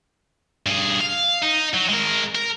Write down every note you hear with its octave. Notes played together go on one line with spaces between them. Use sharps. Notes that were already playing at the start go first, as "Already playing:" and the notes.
G2 G#4
F5
D#4
F#3
G#3 A#4
A#4